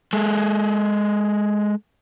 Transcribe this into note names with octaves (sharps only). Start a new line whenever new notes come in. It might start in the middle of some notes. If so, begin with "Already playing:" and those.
G#3 A4